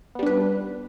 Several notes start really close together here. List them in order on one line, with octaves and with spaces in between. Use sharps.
B3 G3 D4 B4